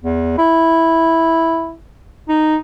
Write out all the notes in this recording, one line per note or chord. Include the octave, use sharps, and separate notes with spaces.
E2
E4
D#4